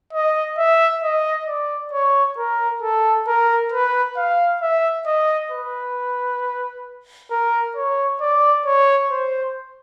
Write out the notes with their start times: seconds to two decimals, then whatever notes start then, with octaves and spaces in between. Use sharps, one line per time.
0.13 D#5
0.58 E5
1.03 D#5
1.47 D5
1.92 C#5
2.38 A#4
2.82 A4
3.27 A#4
3.72 B4
4.17 F5
4.62 E5
5.06 D#5
5.52 B4
7.31 A#4
7.76 C#5
8.21 D5
8.66 C#5
9.11 C5